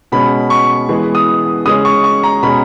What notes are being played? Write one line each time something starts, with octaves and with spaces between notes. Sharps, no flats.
B2 G#3 C#4 B5
C#6
E3 G#3 B3
D#6
C#3 G#3 C#4 D#6
C#6
C#6
A#5
B2 G#3 C#4 B5